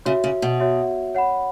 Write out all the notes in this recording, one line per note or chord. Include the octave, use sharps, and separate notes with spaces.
C#3 F#4 C#5 E5
C#3
B2
F#4 C#5 E5
C#5 F#5 B5